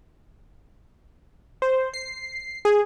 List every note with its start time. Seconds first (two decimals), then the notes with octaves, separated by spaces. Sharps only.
1.62 C5
1.94 C7
2.65 G#4